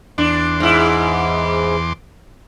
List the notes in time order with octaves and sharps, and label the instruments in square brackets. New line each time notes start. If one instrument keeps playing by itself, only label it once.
[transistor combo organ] E2 C6 D6 [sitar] D4
[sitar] G#2 E4